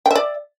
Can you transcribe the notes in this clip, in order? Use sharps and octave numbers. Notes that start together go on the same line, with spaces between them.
D5 E5 G5